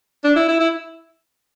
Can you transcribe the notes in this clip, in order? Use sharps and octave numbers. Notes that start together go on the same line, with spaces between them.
D4
E4
E4
E4